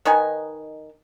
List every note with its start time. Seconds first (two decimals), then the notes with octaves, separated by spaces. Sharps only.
0.05 D#3 D#4 B4 G#5